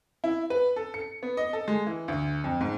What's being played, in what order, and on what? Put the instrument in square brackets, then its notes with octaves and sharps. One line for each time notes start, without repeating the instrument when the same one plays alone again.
[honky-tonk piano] E4
B4
A4
C#7
B3
D#5
A4
G#3
E3
D2
F2
G#2